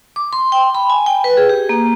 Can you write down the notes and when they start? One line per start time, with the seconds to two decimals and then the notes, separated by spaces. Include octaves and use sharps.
0.16 D6
0.33 C6
0.52 G5
0.75 B5
0.90 G#5
1.06 G5
1.24 B4
1.37 G#4
1.49 G4
1.69 A#3